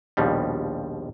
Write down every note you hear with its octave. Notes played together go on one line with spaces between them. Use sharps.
A#1 D#2 B2 F3 G3